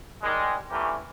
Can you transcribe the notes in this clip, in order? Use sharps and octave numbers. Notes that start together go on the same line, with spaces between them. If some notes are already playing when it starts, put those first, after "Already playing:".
D#3 G3 G#3
D3 E3 A3 C#4 G4 A#4